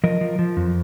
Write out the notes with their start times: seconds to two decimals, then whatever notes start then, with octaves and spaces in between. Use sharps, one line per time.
0.04 F3 A#4 D#5
0.21 F3
0.39 F3
0.57 F2